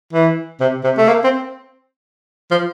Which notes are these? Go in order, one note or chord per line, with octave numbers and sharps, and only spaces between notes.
E3
C3
C3
A3
A#3
C4
F3